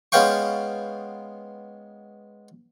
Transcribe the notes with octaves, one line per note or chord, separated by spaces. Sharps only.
G#3 B3 C#4 F5 G5 C#6